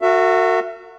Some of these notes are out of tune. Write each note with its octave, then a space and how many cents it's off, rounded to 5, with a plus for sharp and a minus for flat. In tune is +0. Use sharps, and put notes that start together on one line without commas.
F#4 -10 A#4 -45 E5 +25